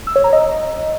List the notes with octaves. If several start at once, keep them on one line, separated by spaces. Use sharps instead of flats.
E6
C#5
A#5
D#5